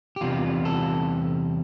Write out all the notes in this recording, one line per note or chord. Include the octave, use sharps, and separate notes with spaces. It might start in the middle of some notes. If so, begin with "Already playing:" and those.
G4
E2 C3 G3 F4
A4